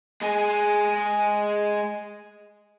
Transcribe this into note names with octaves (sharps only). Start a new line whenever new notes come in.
G#3 G#4